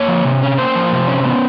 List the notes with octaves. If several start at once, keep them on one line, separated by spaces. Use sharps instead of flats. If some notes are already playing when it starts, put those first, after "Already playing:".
Already playing: A#3 C#5
F3
C3
C#4
A#3 C5
F3
C3
C#4
B3